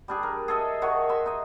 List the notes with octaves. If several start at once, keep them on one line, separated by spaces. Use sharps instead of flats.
G3 D4 G#4
A#4
G#4 A4 D#5 E5
D#3 F#4 C#5
E5 C6
D#4 D#5